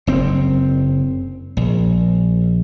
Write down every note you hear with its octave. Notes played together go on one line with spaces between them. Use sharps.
F#1 C4
A#1